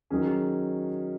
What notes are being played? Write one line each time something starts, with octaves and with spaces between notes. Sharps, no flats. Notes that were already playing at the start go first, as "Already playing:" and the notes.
D#3 F#3 C#4 G#4